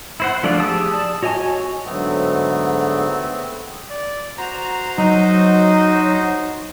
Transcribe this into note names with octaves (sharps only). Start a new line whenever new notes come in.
E4 C5 F#5
F3 A3 D4 F4 D5
G4 G#4 A5 D#6 E6
D5 A5
F#4 C#5 D#5 G#5 C#6
G#2 D3 F#3 A3 B3 C4
D5
F#4 C5 A#5
F#3 D#4 D#5